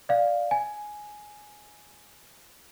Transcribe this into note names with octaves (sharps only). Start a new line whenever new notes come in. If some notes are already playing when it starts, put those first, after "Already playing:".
D5 F5
G#5